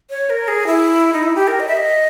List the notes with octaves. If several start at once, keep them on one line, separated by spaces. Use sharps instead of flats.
C#5
A#4
G#4
E4
D#4
E4
G4
A#4
D#5
E5
D#5